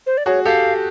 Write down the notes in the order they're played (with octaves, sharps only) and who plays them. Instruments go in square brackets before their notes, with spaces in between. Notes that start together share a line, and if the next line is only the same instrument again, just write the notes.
[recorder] C5
D5
[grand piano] F#4 G#4 [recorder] C#5
[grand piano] G4 A4 [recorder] F5